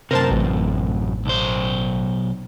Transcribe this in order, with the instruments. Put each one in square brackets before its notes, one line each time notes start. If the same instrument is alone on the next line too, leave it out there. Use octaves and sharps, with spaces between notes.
[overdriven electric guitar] F#2 C3 [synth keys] A#4 C5 A5
[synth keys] A1
[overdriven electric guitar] B1 C5